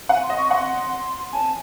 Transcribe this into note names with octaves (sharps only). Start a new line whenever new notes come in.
F#5 G#5
C6
D#5
C#6
F#5 C6 C#6
G#5 A5